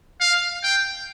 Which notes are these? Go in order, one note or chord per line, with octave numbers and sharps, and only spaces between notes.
F5
G5